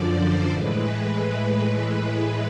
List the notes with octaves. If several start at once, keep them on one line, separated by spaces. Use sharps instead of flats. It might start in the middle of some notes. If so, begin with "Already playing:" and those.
Already playing: F#2 D3 F3 D5
C5
A2 E3 G#3 B4